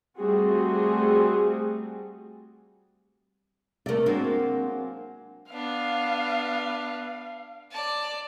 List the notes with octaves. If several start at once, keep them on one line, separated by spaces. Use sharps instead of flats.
G3 A3 C4 F#4 G#4
C3 A3 A#4 D5
F#3 G#3 A#3 C4 D4
B3 D4 F5
D5 A5